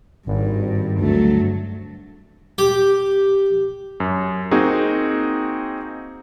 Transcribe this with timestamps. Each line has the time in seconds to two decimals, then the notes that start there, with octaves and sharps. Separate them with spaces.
0.26 G#1 G2
0.99 D2 G2 F#3 A3
2.58 G4
4.00 F#2
4.51 A#3 C4 D#4 F#4 G#4